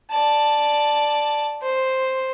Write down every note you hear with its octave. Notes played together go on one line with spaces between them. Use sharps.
D5 A5
C5